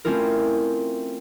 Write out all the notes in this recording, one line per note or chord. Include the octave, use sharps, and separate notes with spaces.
A3 C4 C#4 E4 F4 A#4